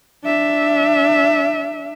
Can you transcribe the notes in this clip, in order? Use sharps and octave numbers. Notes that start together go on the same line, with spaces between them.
D4 E5